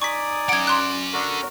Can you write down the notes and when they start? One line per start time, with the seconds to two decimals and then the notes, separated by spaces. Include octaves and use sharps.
0.02 D#4 D5 G#5 C#6 D#6 B6
0.49 C#4 F#5 G#6 D7
0.67 C6 F#6
1.13 D3 F#4 A#4